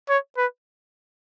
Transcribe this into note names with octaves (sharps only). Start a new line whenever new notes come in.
C#5
B4